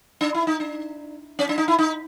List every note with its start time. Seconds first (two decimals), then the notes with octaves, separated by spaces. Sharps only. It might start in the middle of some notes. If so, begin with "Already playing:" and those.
0.21 D4
0.34 E4
0.47 D#4
0.60 D4
1.39 C#4
1.49 D4
1.58 D#4
1.68 E4
1.78 D#4